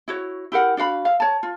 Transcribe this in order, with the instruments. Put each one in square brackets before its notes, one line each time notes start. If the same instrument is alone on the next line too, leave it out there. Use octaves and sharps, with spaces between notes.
[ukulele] E4 F#4 C#5
E4 G4 A#4 F#5
D4 F#4 F5 B5
E5 F5
C#5 A5
F4